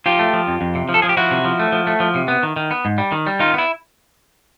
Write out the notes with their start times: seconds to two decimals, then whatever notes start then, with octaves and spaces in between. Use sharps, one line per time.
0.06 F3 F4 G4
0.19 A3
0.33 F3
0.48 F2
0.61 F2
0.75 C3
0.89 F3
0.94 A4
1.02 F3 G#4
1.09 G4
1.17 F3 E4 F#4
1.31 C3
1.45 F3
1.59 A3
1.72 F3
1.87 A3
2.00 F3
2.15 C3
2.28 B3
2.43 D#3
2.56 D#3
2.71 B3
2.85 G#2
2.98 G3
3.12 D#3
3.27 G3
3.39 D#3 D#4 F4
3.54 B3
3.58 E4